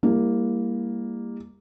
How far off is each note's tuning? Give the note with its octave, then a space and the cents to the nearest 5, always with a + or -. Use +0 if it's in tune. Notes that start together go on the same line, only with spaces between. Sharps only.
G3 +35 A#3 +0 E4 +0